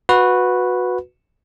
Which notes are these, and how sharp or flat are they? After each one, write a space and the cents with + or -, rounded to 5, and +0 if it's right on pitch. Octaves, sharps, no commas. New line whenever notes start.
F#4 -20 B4 +0